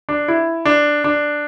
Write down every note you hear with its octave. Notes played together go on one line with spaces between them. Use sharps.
D4
E4
D4
D4